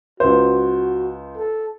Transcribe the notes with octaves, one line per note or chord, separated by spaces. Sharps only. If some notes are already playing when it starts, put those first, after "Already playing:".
C#2 F#4 C5
A4